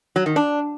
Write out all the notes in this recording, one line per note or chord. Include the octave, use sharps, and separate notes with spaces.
F#3
D#3
D4